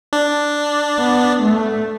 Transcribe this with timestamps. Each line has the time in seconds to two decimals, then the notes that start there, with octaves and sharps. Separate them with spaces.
0.13 D4
0.99 B3
1.42 A3